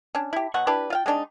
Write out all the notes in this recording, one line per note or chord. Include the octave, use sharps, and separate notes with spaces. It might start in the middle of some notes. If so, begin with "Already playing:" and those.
C#4 D4
E4 G4
B2 F#3 F#5 C#6
D4 E4 G4 B4
F4 F5 G5
G#3 C4 D4 D#4